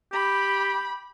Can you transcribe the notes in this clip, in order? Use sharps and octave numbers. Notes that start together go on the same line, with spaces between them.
G4 B5